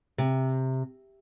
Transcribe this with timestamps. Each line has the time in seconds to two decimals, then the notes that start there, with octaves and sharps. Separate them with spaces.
0.18 C3